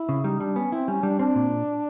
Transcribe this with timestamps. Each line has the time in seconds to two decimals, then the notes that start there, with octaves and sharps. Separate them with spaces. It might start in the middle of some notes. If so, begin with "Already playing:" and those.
Already playing: E4
0.09 C#3
0.24 G3 D#4
0.40 G3 D4
0.55 B3 C#4
0.72 C4 E4
0.88 G3 C#4
1.03 G3 D4
1.19 C4 D4
1.35 A#2